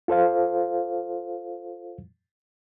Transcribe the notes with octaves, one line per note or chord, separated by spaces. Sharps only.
F4 A4 C5 F5